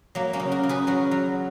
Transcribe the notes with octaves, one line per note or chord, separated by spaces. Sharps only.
F#3 A#3
A#3 C#4
C#3
F#4 A#4
C#3
G#4 B4
F#3 F#4 A#4
F#3